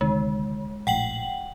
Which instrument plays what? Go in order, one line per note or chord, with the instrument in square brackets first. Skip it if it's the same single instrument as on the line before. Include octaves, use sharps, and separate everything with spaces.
[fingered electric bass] D2 C3 D#3 [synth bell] G#3
[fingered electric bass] A#1 A2 [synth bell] F#5 G5 F#7